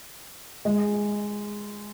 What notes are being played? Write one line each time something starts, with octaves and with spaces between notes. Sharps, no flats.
G#3